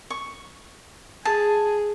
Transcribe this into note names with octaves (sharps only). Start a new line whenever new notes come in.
C#6
G#4 A5